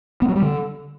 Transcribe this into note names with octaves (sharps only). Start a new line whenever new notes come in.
B3
F#3
G3
D3